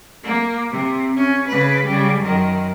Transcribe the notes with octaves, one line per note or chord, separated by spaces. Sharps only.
A#3
C3
C#4
C#3 B4
C#3 G3
F#2 D#3